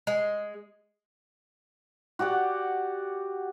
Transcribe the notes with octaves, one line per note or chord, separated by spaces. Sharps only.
G#3
F#4 G4 D5 F#5